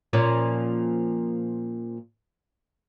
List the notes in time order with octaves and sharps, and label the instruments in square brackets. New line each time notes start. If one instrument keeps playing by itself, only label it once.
[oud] A#2 F3 C#4